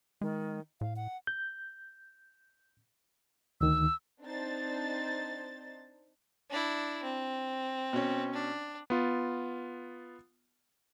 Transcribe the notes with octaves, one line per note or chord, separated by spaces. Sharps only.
D#3 G#3
A2 F5
F#5
G6
D2 D#3 E6
C4 D4 D#4 C5 A6
D4 E4
C4
B2 C#4
D4
B3 F4